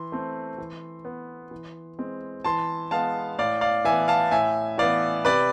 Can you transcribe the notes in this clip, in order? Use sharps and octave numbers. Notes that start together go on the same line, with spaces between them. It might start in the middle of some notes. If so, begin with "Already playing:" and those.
Already playing: E3 C6
A3 C4
E3
B3
E3
G#3 C4
E3 A5 C6
G#3 B3 F5 A5
A2 D5 F5
D5 F5
E3 B3 E5 G#5
F5 A5
A2 E5 G#5
E3 B3 D5 F5
C3 B4 D5